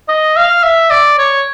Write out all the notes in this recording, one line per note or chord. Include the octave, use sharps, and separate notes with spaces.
D#5
F5
E5
D5
C#5